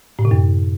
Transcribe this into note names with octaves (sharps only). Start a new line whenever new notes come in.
A2
C3
F#2